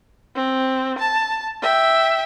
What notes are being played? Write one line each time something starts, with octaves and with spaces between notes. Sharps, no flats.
C4
A5
E5 G5